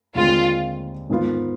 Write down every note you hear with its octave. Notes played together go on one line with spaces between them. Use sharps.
D#2 D3 G#3 C4 F4
G#2 D#3 B3 F4